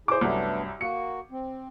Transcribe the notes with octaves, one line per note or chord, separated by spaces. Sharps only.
E4 G#4 C5 D6
C2 F#2 A3 B3 D4
A#3 F#4 C#7
C4